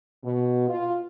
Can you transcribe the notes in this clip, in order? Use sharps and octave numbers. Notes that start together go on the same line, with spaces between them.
B2
F4